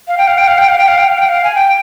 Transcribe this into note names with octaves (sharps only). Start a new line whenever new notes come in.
F5
G5
F5
G5
F5
G5
F5
G5
F5
G5
F5
G5
F5
G#5
G5